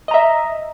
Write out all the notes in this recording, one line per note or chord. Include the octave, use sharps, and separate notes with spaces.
D#5 E5 A#5